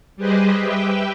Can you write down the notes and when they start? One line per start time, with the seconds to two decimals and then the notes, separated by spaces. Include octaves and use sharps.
0.16 G3 G4 G#4 B4 C5 D#5
0.60 G4 B4 E5 G5